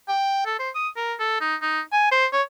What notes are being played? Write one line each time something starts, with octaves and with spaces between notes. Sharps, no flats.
G5
A4
C5
D#6
A#4
A4
D#4
D#4
G#5
C5
C#5